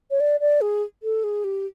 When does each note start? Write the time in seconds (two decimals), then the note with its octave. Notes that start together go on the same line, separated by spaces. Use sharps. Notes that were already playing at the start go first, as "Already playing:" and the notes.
0.11 C#5
0.20 D5
0.40 D5
0.61 G#4
1.03 A4
1.24 G#4
1.44 G4